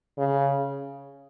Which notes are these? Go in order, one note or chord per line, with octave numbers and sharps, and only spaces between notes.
C#3